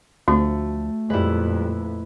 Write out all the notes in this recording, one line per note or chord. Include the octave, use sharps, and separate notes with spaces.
D2 F3 A3 F#4
F2 A#2 G3 G#3 E4 B4